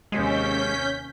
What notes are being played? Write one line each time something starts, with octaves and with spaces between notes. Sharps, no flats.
D#2 C3 G#3 C#4 G6 B6